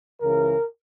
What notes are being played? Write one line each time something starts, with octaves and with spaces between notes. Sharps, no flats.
C#2 C#3 E3 A#4